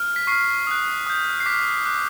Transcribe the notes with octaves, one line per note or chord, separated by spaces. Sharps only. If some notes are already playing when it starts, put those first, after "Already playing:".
Already playing: F6
B6
C#6 F6 C7
D#6 F#6
D#6 G6
C7
D6 F6 B6
D6 F#6